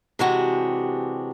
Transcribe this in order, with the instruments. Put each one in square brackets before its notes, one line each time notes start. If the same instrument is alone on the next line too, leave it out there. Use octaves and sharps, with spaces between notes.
[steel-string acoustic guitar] C3 E3 G#3 D4 F#4 G4